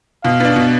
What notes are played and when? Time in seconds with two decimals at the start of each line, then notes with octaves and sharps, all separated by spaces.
0.24 B2 F5
0.40 B3 D4
0.56 B2